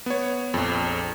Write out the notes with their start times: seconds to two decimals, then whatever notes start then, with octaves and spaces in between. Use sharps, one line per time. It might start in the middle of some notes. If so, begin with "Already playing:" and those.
0.06 B3 C#5
0.54 A#1 F2